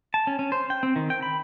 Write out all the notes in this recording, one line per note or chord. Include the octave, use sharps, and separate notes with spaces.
A5
C#4
C#4
C5
G5
C4
D#3
G5
B5